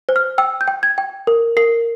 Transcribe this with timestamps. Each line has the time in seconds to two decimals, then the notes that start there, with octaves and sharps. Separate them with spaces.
0.09 C5
0.16 F6
0.38 G5 E6
0.61 G6
0.68 G5
0.83 G#6
0.98 G5
1.27 A#4
1.57 A#4 C7